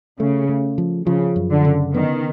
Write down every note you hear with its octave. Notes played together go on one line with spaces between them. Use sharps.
C#3 A3
A3
F3
C#3 F3
F#2
D3
C#3
D#3 B3